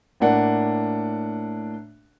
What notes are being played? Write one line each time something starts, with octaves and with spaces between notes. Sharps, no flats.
A2 A#3 D4 F#5